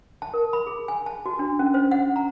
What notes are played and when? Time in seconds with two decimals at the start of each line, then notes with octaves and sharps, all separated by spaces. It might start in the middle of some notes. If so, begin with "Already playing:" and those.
0.22 A5
0.34 A#4
0.53 B5
0.67 G#4
0.88 G#5
1.06 A5
1.26 F#4
1.39 D4
1.59 C#4
1.74 C5
1.91 F#5
2.16 A#5